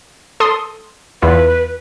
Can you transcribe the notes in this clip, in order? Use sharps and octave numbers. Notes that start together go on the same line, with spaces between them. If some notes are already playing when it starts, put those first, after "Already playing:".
A4 C6 D#6
E2 E4 F4 B4